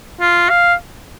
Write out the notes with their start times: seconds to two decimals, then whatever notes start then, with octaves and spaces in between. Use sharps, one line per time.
0.20 F4
0.49 F5